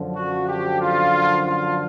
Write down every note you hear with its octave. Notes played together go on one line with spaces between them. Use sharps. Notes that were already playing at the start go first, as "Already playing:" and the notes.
Already playing: F#2 D3 F3
F#4
G4
F4
F4